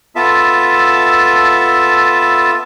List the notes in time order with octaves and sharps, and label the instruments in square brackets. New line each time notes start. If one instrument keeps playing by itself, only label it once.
[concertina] B3 F4 A4 E5 A5